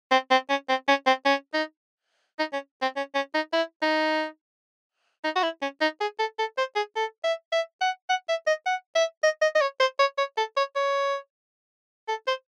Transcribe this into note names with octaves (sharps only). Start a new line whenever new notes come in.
C4
C4
C#4
C4
C#4
C4
C#4
D#4
D#4
C#4
C4
C#4
C#4
D#4
E4
D#4
D#4
F#4
E4
C#4
D#4
G#4
A4
A4
C5
G#4
A4
E5
E5
F#5
F#5
E5
D#5
F#5
E5
D#5
D#5
D#5
C#5
C5
C#5
C#5
A4
C#5
C#5
A4
C5